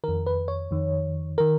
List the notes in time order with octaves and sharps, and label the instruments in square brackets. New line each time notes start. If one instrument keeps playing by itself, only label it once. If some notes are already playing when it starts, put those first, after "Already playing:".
[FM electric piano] F2 D#3 A#4
B4
C#5
F2 D#3
D#3 A#4